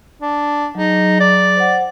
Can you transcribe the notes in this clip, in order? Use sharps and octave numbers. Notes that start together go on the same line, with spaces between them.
D4
F#3 D#4 G#4
D5
C5 F#5